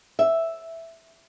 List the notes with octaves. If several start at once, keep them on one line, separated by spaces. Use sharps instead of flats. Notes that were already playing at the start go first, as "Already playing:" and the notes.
E5